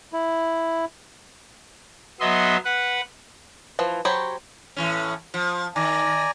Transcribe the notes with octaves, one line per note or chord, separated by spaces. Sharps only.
E4
F#3 B3 D#5 E5 C6
B4 F#5
E3 F3
F#3 G4 C5 C#5 B5
A2 E3 C#4
F3
D#3 D5 G#5 A#5